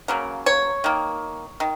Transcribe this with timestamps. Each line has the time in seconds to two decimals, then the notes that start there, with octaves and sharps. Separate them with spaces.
0.08 C#3 F#3 A#3
0.46 C#5
0.84 D#3 A#3
1.60 D#3